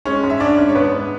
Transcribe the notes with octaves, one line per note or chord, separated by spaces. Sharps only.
G#3 C#4 C#5
G#2
E5
C#4 D4 D5
G#2
C#5
G#2 B3 B4
G#2